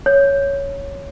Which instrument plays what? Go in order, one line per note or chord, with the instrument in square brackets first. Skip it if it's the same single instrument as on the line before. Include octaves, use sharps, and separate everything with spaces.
[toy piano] C#5